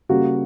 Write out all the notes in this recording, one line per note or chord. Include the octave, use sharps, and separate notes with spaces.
C#3 G3 A#3 F#4